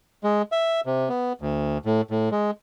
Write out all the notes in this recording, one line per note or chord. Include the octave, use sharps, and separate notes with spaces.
G#3
E5
C3
B3
D2
A2
A2
G#3